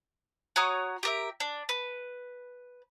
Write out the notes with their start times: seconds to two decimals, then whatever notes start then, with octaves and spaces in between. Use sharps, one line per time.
0.56 F#4 C#5 A#5 D#6
1.03 G4 A#4 E5
1.40 D4
1.69 B4